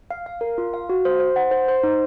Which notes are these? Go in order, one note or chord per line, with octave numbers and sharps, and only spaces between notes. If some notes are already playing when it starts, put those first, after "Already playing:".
F5
F5
A#4
F4
F5
F#4
C5
C5
F#5
C5
C5
D#4